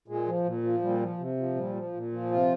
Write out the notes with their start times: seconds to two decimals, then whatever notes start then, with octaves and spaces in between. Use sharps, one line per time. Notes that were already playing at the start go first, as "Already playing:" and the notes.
0.08 A#2 G#3
0.26 F3
0.44 A#2
0.63 F3
0.82 A#2 G3
1.00 F3
1.18 C3
1.37 F3
1.55 A#2 G3
1.75 F3
1.93 A#2
2.12 F3
2.31 C3 F4